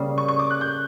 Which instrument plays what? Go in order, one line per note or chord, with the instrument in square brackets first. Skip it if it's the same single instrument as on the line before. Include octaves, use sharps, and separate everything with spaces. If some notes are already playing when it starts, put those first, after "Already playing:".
Already playing: [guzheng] C#3 G3 A#3
[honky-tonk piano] C#6
C#6
D6
F#6
G6